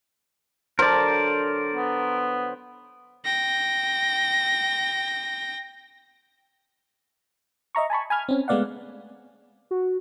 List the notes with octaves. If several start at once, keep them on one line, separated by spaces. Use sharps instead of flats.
D3 F#3 A#4 C5 D5 B5
B3
G5 A#6
D#5 E5 A#5 C#6
G#5 A5 B5 C#6
G#5 B5 F6 G#6
C4 C#4
G#3 A3 B3 D5 F5 F#5
F#4